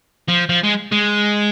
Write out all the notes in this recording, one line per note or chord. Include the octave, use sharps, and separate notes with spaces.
F3
F3
G#3
G#3